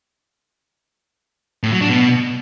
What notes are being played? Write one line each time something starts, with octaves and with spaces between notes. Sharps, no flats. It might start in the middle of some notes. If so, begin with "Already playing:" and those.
A2
F#3
D4
B2